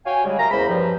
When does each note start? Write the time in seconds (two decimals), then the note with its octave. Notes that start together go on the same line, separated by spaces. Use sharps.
0.06 F#4 C#5 F5 G5 G#5
0.24 C#3 G3 G#3
0.38 A#4 E5 F5 A#5
0.51 E2 C#3 A#3 C5 B5
0.68 G2 F3